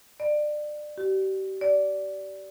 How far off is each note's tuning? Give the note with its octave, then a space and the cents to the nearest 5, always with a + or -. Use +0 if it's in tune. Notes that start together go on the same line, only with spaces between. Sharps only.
D5 +25
G4 -35
D5 -15